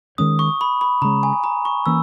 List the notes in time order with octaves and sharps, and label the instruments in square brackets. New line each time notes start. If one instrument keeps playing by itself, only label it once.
[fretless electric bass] D#3 G#3 C#4 [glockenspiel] D#6
[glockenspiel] C#6
B5
B5
[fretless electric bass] C#3 [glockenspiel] A#5
[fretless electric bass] G#3 C#4
[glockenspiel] G#5
A#5
C#6
[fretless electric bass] E3 A#3 C#4 [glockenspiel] E6